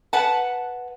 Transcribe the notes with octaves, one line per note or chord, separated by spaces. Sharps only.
B4 F#5 A5